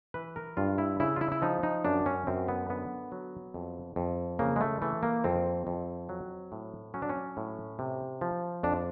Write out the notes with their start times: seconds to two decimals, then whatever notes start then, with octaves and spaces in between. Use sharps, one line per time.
0.14 E3 B4
0.36 A#4
0.57 G2 F4
0.78 E4
1.00 C#3 E4
1.16 F4
1.21 E4
1.32 E4
1.42 F3 D#4
1.63 D#4
1.85 F#2 D4
2.06 C#4
2.27 F#2 C4
2.48 B3
2.69 D3 B3
3.12 F#3
3.54 F2
3.96 F2
4.39 C#3 A#3
4.56 G#3
4.61 A3
4.82 E3 A3
5.03 A#3
5.24 F2 C4
5.67 F2
6.09 F#3
6.52 A2
6.94 F#3 C#4
7.02 D4
7.09 C#4
7.37 A2
7.79 C3
8.21 F3
8.63 F2 D4